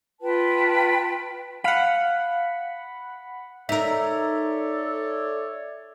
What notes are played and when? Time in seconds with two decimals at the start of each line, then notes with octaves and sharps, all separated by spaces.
0.20 F4 B4 G5 A5
1.64 F5 F#5 B5
3.69 D#4 A4 A#4 C#5 D5 E5